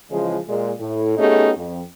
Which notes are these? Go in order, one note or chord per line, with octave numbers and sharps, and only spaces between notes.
C#3 E3 F3 G#3
A#2 G#3
A2
A3 B3 C#4 D#4 G4 G#4
F2